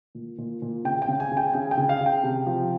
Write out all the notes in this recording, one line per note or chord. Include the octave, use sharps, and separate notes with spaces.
A#2
A#2
A#2
C#3 G5
G5
C#3
G#5
C#3
G5
C#3 G#5
G5
C#3
F5
C#3
G5
C3
F3